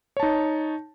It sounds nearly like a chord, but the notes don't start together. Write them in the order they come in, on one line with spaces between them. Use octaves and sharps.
C#5 A5 D#4